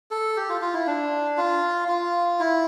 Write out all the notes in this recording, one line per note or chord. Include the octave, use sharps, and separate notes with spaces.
A4
G4
F4
F4
E4
D4
F4
F4
E4